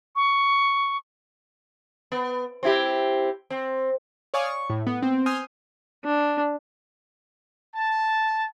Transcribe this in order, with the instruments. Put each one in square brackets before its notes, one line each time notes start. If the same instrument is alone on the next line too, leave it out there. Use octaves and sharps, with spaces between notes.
[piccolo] C#6
[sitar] B3
C4 E4 G4
C4
[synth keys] C#5 D5 F5 G#5 C#6 D#6
C#6
A2
B3
C4
G#5 C6 D#6 F6 G6
[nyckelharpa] D4
[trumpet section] A5